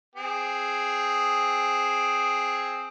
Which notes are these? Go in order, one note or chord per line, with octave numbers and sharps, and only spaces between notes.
C4 G#4